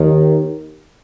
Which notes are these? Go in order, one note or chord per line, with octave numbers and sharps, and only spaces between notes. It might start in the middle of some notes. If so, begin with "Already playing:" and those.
Already playing: D#2 D#3